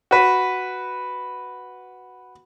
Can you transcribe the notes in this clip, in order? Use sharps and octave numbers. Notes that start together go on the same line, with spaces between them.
F#4 B4